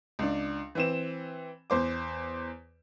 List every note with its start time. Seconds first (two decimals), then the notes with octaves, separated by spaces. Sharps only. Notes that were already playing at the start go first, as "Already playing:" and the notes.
0.19 C#2 D4
0.75 E3 C4 E7
1.70 E2 C5 D6